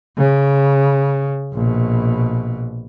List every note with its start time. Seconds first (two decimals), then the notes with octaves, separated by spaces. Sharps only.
0.17 C#3
1.54 A#1 B2